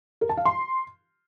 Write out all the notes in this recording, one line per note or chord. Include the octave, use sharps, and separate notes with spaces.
A#4
A5
F5
C6